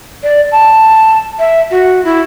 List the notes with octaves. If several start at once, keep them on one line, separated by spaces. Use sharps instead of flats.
D5
A5
E5
F#4
E4